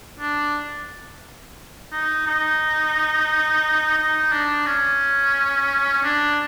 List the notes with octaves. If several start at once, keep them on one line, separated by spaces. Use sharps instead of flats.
D4
D#4
D#4
D#4
D4
C#4
D4